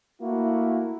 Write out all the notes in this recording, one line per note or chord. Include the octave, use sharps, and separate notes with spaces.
A3 A#3 E4 F#4